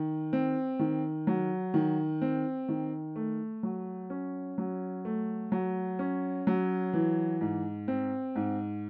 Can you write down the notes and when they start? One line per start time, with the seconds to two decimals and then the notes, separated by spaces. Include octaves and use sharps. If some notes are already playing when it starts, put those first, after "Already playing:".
Already playing: D#3
0.33 C4
0.79 D#3
1.27 F#3
1.74 D#3
2.22 C4
2.68 D#3
3.16 A3
3.63 F#3
4.10 C#4
4.58 F#3
5.05 A3
5.52 F#3
5.99 C#4
6.47 F#3
6.93 E3
7.41 G#2
7.88 C4
8.36 G#2